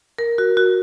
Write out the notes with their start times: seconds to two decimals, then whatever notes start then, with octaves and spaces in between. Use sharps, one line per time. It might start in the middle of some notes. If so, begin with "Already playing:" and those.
0.18 A#4
0.38 F#4
0.57 F#4